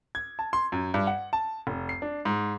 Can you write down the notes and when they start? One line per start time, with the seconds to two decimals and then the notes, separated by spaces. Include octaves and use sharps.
0.15 G#6
0.39 A5
0.53 C6
0.72 F#2
0.94 G2
1.07 F#5
1.33 A5
1.67 F1
1.89 C7
2.02 D4
2.25 G#2